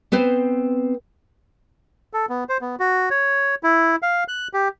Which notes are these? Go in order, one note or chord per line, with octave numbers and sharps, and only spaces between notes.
B3 C4 B4 C5
A4
B3
C5
B3
F#4
C#5
E4
F5
F#6
G4